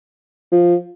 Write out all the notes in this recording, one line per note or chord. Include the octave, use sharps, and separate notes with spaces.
F3